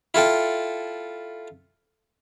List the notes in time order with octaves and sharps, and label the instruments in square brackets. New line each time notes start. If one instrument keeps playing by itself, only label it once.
[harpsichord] E4 F4 A4 G5